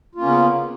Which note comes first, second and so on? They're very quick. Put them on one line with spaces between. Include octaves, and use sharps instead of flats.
F4 A#3 C#4 C#3 B3